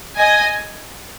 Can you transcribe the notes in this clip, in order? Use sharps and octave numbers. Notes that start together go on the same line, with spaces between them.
D#5 G#5